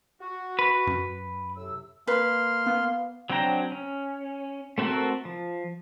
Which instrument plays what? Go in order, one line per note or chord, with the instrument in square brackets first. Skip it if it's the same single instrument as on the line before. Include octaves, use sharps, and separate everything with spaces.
[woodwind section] F#4
[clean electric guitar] B4
[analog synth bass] F#2
[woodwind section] A2 C3 E6
[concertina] A#3 C6 F6 [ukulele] B4
[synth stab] B3 [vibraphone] F5
[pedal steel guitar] F#3 C4 D4 G5 A#5
C#4
A3 C4 F#4 A4 A#4
F3